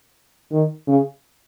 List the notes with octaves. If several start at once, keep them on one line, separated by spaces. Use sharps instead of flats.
D#3
C#3